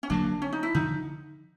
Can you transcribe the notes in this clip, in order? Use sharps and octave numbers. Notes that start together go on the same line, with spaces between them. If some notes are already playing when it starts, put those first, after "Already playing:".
C#4
D3 F#3 A#3 D4
C#4
D#4
E4
D3 F3 D#4